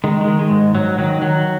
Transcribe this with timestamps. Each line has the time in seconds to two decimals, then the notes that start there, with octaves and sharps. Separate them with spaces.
0.04 D#3 G#3
0.21 G#3
0.28 D#3
0.39 G#3
0.51 G#2
0.75 G#2 F#3
0.98 D#3 F#3
1.22 D#3 F#3